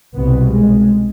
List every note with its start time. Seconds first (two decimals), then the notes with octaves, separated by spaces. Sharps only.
0.16 C2 B2 B3
0.52 G#3